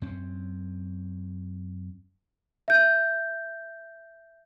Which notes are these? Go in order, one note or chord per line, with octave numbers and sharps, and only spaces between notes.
F#2 C4 C#4
E5 G6